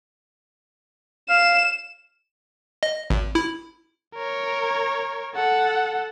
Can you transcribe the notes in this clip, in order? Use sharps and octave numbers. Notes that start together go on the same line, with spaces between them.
F5 E7
D#5
G#1
E4
A#4 C#5
A4 F#5